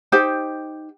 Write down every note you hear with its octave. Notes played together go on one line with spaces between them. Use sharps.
D#4 G4 C5 G5